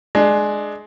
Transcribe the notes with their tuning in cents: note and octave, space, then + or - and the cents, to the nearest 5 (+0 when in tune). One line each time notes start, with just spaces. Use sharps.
G#3 +20 D4 +30